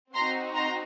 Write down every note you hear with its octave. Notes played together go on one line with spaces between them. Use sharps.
C4 D#4 F#4 A#5 C6
A#5 C6